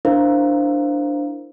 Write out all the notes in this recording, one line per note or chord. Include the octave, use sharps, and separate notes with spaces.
D4 E4 A#4 C5 F5